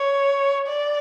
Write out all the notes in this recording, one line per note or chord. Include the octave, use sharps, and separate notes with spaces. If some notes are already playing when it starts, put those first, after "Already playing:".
Already playing: C#5
D5